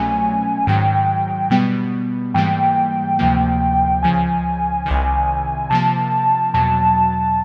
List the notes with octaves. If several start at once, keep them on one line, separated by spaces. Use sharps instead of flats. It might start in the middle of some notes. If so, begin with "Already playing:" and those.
Already playing: C2 B2 F#3 A3 C#4 G#5
G#2 D#3 F#3 G5
B2 G3 B3
G#2 E3 G3 A#3 G5
D2 C3 F3 A#3
C#2 C#3 F3 G#5
C2 C3 D#3
C3 F3 A#3 A5
E2 B2 F#3 A5